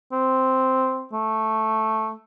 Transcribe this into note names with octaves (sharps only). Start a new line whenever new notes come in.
C4
A3